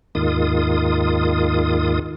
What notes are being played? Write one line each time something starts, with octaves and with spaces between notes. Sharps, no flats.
D#2 G#2 D#3 F4 D#6